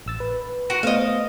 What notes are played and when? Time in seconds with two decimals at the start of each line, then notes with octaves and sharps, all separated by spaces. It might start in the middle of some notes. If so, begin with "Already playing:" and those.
0.06 A1 E6 A6
0.20 B4
0.70 F#4 A#4
0.83 A3 B3 C5 D#5 F5